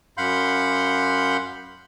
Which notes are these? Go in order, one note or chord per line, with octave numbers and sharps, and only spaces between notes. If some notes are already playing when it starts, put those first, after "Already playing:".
F#2 F5 F#5 B5 C6 G6